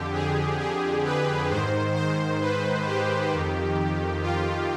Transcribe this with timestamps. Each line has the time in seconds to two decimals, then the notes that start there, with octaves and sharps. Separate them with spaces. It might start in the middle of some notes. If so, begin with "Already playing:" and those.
Already playing: F2 D3 G4
0.13 G#4
0.60 G#4
1.04 B4
1.50 G#2 D#3 C5
1.95 C5
2.41 B4
2.86 G4
3.32 F2 D#3
4.22 F4